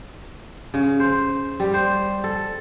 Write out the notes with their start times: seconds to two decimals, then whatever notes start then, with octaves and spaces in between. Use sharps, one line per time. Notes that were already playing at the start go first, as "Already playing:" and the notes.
0.74 C#3
1.00 C5
1.60 G3
1.74 C5
2.24 A4